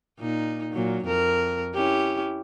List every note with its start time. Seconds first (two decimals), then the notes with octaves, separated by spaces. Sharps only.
0.19 A#2 D#4
0.72 A#2 F#3
1.05 F2 A#4
1.75 C#4 E4 G4